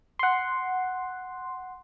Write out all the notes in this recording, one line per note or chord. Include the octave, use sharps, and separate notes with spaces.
F#5 C6